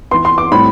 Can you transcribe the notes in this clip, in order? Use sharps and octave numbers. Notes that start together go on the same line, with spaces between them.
E3 B3 C6
C6
D6
A2 G3 C4 B5